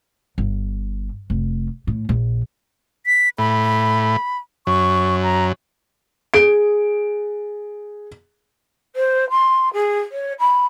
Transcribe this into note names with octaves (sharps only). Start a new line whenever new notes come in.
G1
F1
A2
A#1
B6
A2 B5
F#2 C#6
A#5
G#4 D7
C5
C6
G#4
C#5
B5